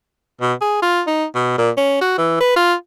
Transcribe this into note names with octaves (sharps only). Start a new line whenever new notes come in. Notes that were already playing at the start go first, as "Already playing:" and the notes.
B2
G#4
F4
D#4
B2
A#2
C#4
F#4
E3
B4
F4